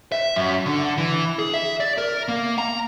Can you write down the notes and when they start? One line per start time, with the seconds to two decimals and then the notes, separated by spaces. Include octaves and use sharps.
0.12 E5
0.36 F#2
0.66 D3
0.98 E3
1.39 G#4
1.54 E5
1.80 D5
1.98 A#4
2.28 A#3
2.58 A#5